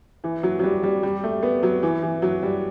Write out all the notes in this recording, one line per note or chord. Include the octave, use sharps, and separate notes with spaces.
E3
F#3
F#3
G3
G3
G3
A3
B3
F#3
E3
E3
F#3
G3